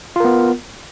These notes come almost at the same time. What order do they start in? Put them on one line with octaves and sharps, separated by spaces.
F4 A#4 B3